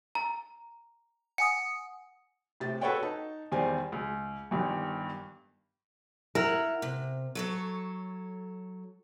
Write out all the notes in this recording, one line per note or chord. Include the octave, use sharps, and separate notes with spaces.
A#5
F#5 G#5 D#6 C#7
A2 C3 A6
F#4 A4 B4 C#5 F#5 G5
D#4 A5
E2 D#3 G3 C5 D5 G#5
C#2
G1 G2 D#3
E4 A#4 F#5
C3
F#3 A4 C#5